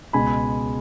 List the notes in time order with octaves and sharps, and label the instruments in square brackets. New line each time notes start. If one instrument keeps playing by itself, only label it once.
[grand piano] C#2 B2 G#3 G#5 B5